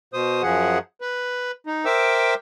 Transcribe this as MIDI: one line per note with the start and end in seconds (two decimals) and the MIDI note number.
0.13 0.42 47
0.13 0.42 72
0.13 0.42 87
0.43 0.78 42
0.43 0.78 53
0.43 0.78 68
0.43 0.78 78
1.01 1.51 71
1.67 1.85 63
1.85 2.34 70
1.85 2.34 72
1.85 2.34 76
1.85 2.34 79
1.85 2.34 86
1.85 2.34 88